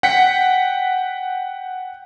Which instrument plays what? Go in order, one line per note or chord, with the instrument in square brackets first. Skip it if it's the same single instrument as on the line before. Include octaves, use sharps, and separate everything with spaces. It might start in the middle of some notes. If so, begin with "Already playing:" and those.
[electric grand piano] F#5 G5 B6 C#7